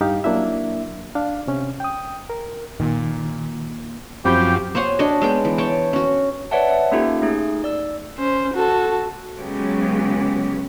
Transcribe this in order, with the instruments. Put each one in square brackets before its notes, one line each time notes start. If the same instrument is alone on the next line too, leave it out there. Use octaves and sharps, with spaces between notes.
[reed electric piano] G2 D#4 G4 F5
F#3 A#3 D4 E4 E5
D4 F5
C3 C#4
G5 D#6
A#4
[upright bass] A#2 [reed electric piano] D#3
[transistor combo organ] F#2 F3 [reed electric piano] C4 B5 G6 [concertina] G4 G5
[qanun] C5 C#5 F#5 G#5
D4 F#4 C#5 D#5
G#3 B3 G5
E3
C#5 G5 A5
C#4 F#4
[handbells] B4 C#5 D5 E5 F#5 A5
E5
A#3 C#4 D#4 F4 G4 A4
A3 D#4 G#4
D5 E6
[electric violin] C#4 C5
F#4 A4
[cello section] C#3 F#3 G#3 B3 G4